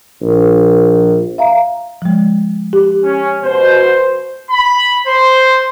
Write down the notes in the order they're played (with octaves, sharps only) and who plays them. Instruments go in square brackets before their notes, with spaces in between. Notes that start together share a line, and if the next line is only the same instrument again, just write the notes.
[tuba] A#1
[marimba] E5 F5 A#5
F3 G#3
G4
[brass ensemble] C#4
B2 C5
[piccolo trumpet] B5
C5